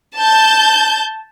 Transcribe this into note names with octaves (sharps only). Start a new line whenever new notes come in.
A5 G6